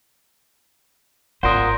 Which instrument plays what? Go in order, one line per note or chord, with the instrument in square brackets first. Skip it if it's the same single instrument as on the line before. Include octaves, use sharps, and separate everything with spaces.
[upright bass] G#1 [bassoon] A#2 [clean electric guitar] A#4 C5 [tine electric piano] F#5 C6 D#6